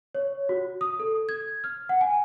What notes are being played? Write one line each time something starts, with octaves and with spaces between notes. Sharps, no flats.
C#5
F#4
D#6
A4
G#6
F6
F#5
G#5